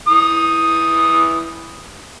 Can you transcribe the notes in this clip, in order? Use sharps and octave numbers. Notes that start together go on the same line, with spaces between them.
E3 D#6